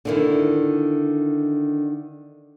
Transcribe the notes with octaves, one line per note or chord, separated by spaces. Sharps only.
D3 D#3 E4